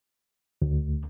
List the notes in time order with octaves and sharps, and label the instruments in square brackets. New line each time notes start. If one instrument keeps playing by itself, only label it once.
[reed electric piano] D2